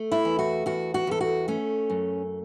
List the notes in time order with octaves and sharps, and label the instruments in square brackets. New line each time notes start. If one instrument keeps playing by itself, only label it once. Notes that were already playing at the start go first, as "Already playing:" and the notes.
Already playing: [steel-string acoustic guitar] A3
E4
E2
F#4
E2 F#4
F#4
E2 A4
F#4
A3 C#4
F#2